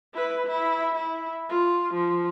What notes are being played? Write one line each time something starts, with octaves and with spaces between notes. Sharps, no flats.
E4 B4
E4
E4
F4
F3